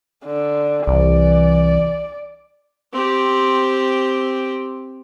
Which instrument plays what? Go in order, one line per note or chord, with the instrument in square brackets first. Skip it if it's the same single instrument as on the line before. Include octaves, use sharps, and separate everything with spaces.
[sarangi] D3
[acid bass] C2 [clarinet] E3 [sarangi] D5
[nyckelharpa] C4 G4